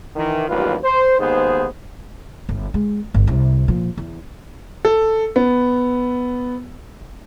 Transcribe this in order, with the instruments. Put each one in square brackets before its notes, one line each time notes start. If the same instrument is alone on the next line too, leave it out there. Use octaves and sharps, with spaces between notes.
[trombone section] D#3 E3
A1 D#2 F#3 G3 F4 B4
C5
D#2 G#2 B3 G#4 C5
[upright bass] G1
G#3
G1 G2
C2 C3
A#2 F3
E2
[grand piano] A4
B3